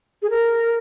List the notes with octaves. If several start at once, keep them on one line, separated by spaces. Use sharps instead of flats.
G#4
A#4